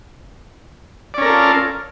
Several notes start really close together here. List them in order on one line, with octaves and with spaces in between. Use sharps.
D5 C#4 A#4 A4 F4